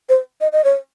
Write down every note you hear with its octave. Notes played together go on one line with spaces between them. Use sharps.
C5
D#5
D#5
C#5